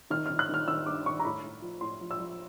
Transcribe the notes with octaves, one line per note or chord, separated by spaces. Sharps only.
D#3 F6
F6
D#3
F#6
D#3 F6
D#3 E6
G2 D6
D#3 C#6
A#5
A2 B5
A2
F3
A2 C6
F3
E6
F3